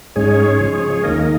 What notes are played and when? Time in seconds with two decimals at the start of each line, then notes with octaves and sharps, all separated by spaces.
0.16 G#2 G#3 C#4 G#4 C#5
0.60 C#3 F3 G#3
1.03 D#2 D#3 A#3 A#4 D#5